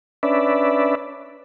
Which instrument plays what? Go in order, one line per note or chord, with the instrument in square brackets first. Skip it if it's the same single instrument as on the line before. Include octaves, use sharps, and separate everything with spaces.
[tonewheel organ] C#4 D4 B4 D5 E5